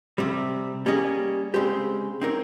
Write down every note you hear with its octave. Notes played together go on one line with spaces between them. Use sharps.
C3 G3 C4
G3 A#3 C#4 G#4 D#5
C#3 G#3 C4 G4 C5
C4 D#4 A#4 C#5